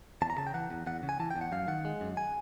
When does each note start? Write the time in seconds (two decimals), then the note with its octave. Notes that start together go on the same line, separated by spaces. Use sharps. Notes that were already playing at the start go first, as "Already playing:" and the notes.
0.22 E2 A5
0.30 A#5
0.38 C#3 A5
0.47 G5
0.54 E3 F#5
0.70 E2
0.87 E2 F#5
1.03 C#3
1.09 G#5
1.20 E3 A5
1.31 G5
1.36 E2
1.41 F#5
1.52 F#2 F5
1.68 D#3 F#5
1.85 G#3
2.01 F#2
2.17 G#5